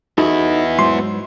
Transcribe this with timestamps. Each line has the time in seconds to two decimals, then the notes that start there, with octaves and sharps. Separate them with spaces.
0.18 B3 D#4 E4 F#4 A4
0.79 G#2 F#3 C6